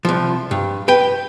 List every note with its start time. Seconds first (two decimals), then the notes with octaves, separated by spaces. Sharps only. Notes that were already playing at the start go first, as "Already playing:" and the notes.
0.05 C2 F3
0.51 G2
0.88 B4 G5